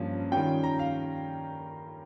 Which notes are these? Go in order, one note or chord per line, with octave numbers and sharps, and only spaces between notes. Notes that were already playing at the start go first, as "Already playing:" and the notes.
Already playing: G2 F3 A#3 C#4 F4
D#3 G3 C#4 F4 G5
A#5
F5